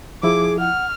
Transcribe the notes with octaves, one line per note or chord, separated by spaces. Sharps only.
F3 E4 G#4 D6
F#5 F6